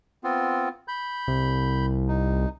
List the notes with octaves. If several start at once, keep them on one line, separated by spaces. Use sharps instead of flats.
B3 C4 F4
B5 G6
C2
D#4